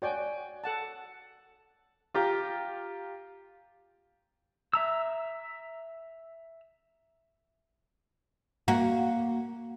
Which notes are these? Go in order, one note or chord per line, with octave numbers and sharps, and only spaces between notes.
F#4 C#5 D5 G5 G#5
A4 F#5 A5
F4 G4 A#5
E5 A#5 E6
A#3 F#4